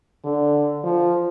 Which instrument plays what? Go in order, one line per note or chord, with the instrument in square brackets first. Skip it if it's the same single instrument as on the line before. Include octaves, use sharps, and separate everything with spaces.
[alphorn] D3
F3